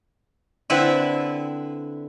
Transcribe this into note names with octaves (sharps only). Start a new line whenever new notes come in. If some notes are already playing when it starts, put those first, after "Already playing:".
D3 C4 E4 B4 E5